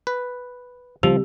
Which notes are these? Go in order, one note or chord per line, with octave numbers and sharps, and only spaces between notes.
B4
C#3 F3 G3 C4 G4